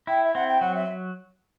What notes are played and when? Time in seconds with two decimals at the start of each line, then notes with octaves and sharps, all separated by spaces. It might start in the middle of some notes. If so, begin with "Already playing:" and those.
0.07 E4 G5
0.24 E5
0.35 C4 F#5
0.47 G5
0.61 F#3 F#5
0.75 E5